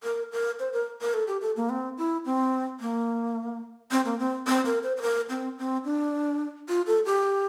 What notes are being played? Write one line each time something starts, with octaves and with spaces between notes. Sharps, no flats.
A#4
A#4
C5
A#4
A#4
A4
G4
A4
A#3
C4
E4
C4
A#3
C4
A#3
C4
C4
A#4
C5
C5
A#4
C4
C4
D4
F4
A4
G4